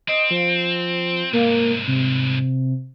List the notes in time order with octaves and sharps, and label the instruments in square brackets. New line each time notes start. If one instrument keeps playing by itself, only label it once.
[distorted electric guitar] C4 [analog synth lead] D#5
[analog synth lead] F3
[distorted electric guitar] C2 G#2 [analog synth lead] A#3
[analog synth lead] C3